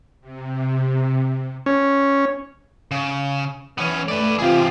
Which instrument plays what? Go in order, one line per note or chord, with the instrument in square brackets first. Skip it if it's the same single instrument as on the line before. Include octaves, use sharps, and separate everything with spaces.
[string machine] C3
[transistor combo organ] C#4
[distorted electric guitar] C#3
[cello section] E3 [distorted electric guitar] B3 C#4
[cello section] A3 [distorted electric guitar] B4 D5
[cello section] C3 E3 F4 [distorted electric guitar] G4 G#4